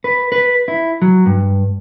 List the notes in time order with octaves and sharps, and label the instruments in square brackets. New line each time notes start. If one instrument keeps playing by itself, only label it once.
[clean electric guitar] B4
B4
E4
F#3
G2